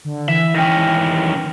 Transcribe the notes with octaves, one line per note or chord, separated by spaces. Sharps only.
D3
E3 E5
D#3 C#4 G5 F6 A#6